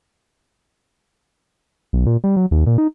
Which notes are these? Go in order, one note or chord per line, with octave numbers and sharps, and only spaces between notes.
B1
A#2
G3
F#3
D#2
A#2
D#4